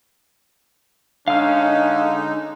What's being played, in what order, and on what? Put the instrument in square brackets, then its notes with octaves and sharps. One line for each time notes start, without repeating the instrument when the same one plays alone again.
[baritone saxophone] D3 [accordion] G#3 D#4 [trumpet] C#4 [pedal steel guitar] F5 F6